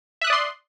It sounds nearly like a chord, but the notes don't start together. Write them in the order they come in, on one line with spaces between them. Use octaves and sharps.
E5 F#6 D#6 D5 C6